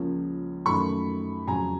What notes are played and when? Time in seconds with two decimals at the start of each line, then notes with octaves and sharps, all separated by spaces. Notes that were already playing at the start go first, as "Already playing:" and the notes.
Already playing: C#2 C#3 F3 A#3 C#4
0.66 F#2 D#3 F#3 A3 B5 C#6
1.47 F2 C#3 F#3 G#5 A#5